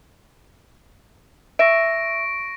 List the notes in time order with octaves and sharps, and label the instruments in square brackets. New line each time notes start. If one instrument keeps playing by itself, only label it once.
[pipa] E5 [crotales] C#6 A#6 D7